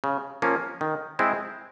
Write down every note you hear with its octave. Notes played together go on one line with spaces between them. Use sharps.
C#3
F3 A#3 C#4
D#3
G#3 C4 E4